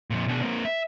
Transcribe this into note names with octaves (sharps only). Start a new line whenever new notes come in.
F2 A#2
B2 D4
A#3 C4
E5